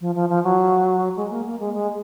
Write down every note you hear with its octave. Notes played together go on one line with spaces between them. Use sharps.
F3
F3
F3
F#3
G#3
A#3
A#3
G#3
G#3